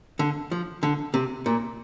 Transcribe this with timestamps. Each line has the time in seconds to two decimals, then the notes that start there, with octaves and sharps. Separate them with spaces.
0.19 D3
0.52 F3
0.83 D3
1.14 C3
1.46 A#2